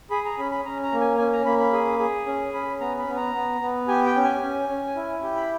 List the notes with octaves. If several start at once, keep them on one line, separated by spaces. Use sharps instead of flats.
G#4 B5
A#5
C#4 B5
B5
C#4 A#5
A#5
A#3
G#5
C#4 G#5
A#5
A#3 B5
B5
G#4
G#4
C#4
C#4 B5
B3 A#5
B5
B3
A#5
B3
B3
G4 G#5
G5
C#4
G#5
C#4
C#4
E4
G4
B5